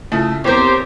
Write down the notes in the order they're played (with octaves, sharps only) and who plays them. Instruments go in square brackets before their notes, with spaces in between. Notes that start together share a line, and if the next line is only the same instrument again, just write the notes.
[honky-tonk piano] C#3 [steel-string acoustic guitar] A3 [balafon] A#3 E4 F4
[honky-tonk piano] E2 C3 [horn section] G4 C5 [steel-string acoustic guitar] A#4 C#5